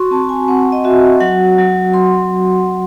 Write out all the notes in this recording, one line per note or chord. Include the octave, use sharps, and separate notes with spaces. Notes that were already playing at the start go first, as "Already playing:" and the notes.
Already playing: F#4 C6 C#6
C4 A5
G#5
C4 F#5
D#5
F#4 E5
F#3 F#5
F#3
F#3 C6